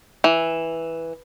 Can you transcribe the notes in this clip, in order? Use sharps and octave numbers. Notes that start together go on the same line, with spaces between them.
E3